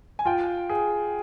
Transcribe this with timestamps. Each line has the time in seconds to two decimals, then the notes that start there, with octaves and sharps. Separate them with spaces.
0.19 G#5
0.25 F4 G5
0.70 G#4